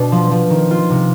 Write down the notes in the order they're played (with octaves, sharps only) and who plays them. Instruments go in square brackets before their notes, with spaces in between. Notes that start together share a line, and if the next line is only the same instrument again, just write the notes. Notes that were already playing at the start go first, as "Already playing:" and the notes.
Already playing: [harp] B2 D4
F3
F3
D#3
F4
C3